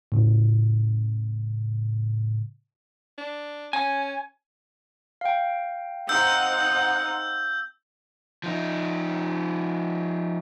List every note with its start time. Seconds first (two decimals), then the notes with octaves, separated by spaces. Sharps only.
0.12 A2 C#3
3.18 D4
3.73 C#4 G#5
5.21 F5 G5
6.09 C4 D#4 F#5 E6 G6
8.44 F3 D#4